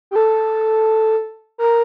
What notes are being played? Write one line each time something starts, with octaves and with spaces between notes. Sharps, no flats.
G4
A4
A#4